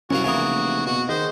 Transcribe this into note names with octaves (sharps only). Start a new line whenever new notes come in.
C2 F#2 C#4 F#4 F5
F1 C#3 E3 A#3 F#4 G#5 D#6
B2 F#4
D#3 G#4 C5 D#5